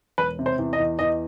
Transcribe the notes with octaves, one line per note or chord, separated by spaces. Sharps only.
E1 B4
C3
C5
E2
D#5
E2
E2 D#5